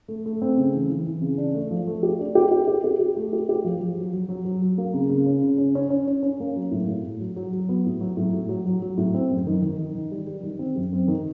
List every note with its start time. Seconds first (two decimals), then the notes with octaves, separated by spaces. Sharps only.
0.08 A3
0.26 A3
0.42 C4
0.57 C#3
0.74 E3
0.89 E3
1.06 E3
1.22 C#3
1.38 D4
1.55 A3
1.71 F3
1.87 A3
2.03 G4
2.19 D4
2.35 G4
2.52 G4
2.68 G4
2.84 G4
2.99 G4
3.16 A3
3.33 G4
3.49 G4
3.64 F3
3.81 F3
3.98 F#3
4.13 F#3
4.29 F#3
4.45 F#3
4.62 F#3
4.78 A#3
4.94 C#3
5.10 C#3
5.26 C#4
5.42 C#3
5.58 C#4
5.75 C#4
5.90 C#4
6.07 C#4
6.23 C#4
6.40 A#3
6.56 F#3
6.71 A2
6.88 A2
7.04 A2
7.20 F#3
7.36 F#3
7.53 F#3
7.69 B3
7.85 A2
8.01 F#3
8.17 A2
8.33 A2
8.49 F#3
8.65 F#3
8.82 F#3
8.97 A2
9.14 C4
9.31 F#2
9.47 D#3
9.62 D#3
9.78 D#3
9.95 D#3
10.11 G3
10.27 G3
10.43 D#3
10.59 C4
10.76 F#2
10.93 C4
11.08 D#3